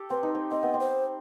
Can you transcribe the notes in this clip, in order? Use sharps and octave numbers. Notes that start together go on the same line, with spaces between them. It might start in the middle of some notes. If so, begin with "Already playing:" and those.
Already playing: G4 A4
C4 B4
D#4
C4
C4 D#5
B3
C4
C5